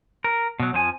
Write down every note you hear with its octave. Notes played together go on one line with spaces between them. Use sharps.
A#4
B2 F#3
F2 F3 F4 G#5